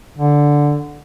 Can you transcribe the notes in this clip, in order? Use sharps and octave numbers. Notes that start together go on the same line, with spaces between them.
D3